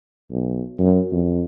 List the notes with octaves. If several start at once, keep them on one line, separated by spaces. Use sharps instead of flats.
B1
F#2
F2